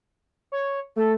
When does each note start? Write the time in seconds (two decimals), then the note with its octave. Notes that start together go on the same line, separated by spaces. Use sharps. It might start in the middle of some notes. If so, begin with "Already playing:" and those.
0.52 C#5
0.96 A3 A4